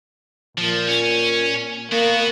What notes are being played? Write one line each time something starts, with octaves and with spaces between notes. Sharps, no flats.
A#2 F3
C#4
A#3 B3 F#4